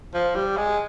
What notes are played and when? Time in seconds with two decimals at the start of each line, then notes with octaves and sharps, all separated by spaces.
0.14 F3
0.35 G3
0.57 G#3